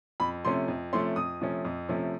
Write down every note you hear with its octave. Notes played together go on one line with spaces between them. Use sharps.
F2 B5
C3 F3 A3 C#4 C6
F2
C3 F3 A3 C#4 C6
F2 D#6
C3 F3 A3 C#4
F2
C3 F3 A3 C#4